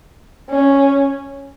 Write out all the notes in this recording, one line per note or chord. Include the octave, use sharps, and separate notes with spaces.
C#4